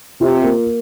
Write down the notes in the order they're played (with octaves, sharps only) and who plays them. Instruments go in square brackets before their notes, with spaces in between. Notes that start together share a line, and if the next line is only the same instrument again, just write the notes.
[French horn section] C3 [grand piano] F4
[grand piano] A#3